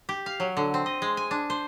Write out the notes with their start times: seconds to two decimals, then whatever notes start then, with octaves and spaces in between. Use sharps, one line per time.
0.09 G4
0.26 F5
0.40 F#3
0.57 D3
0.74 C4
0.86 D#5
1.02 G#3
1.17 G#5
1.31 D4
1.50 C5